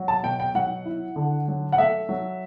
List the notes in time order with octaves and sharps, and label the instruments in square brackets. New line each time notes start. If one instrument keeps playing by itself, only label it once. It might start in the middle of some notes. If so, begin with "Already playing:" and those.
Already playing: [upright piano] F#3
A5
B2 G5
G5
F#3 F#5
E4
D3
F#3
F#5
A3 E5
F#3